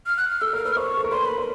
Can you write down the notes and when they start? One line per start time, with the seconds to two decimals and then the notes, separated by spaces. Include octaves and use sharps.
0.06 F6
0.18 F#6
0.30 F6
0.41 A4 E6
0.52 A#4 F6
0.65 B4 F6
0.77 C5 C#6
0.97 A4
1.04 A#4
1.11 B4 C6
1.25 B5
1.38 B4 C6